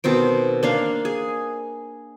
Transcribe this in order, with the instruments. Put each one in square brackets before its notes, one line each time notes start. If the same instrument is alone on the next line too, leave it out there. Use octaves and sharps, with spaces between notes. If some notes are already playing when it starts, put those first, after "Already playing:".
[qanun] B2 D#3 C4 D6
A#3 D4 F5
G#4